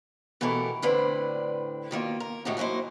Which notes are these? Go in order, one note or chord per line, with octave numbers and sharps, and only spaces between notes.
B2 E3 A3 G4 A4 A#4
A2 D3 C4 D4 B4 D5
B2 D#3 A#3 F4
A#4
A2 D#3 G#3 D#4 F#4 G4
E3 F#3 A#3 D#4 C5